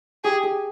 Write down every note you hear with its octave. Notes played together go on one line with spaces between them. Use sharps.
G4 G#4
G#4